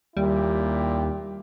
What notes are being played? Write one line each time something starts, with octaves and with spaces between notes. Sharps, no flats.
D#2 A#2 G3 E4 G4